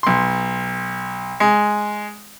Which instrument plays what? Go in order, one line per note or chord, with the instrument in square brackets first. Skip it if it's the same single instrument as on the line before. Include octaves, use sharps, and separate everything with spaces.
[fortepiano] B1 C6
G#3